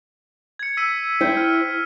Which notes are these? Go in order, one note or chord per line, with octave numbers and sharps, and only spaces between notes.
G#6 C#7
E6 B6 D#7
E4 C5 G5
F6